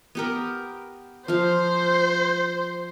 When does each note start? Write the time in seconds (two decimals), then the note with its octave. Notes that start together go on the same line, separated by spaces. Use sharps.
0.15 B3 G4 A#4
1.28 F3 C5 F5